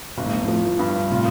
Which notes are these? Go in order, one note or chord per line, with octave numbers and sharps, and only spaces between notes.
G1 B2
A2
G2
F2 A2 F3
G2
A2 C3 F4